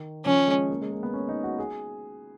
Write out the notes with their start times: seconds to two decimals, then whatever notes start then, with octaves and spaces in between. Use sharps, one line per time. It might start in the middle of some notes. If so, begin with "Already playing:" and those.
Already playing: D#3
0.25 F3 C#4
0.48 G#3
0.70 A#3
0.81 G#3
0.92 A#3
1.03 B3
1.14 C#4
1.29 D#4
1.44 F#4
1.58 G#4